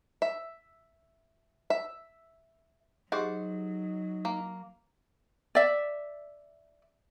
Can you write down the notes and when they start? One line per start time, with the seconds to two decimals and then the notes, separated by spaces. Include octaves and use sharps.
0.22 E5
1.70 E5
3.12 F#3 D#4 G4 G#4 C5 D#5 F#5
4.25 A#3
5.55 D5 E5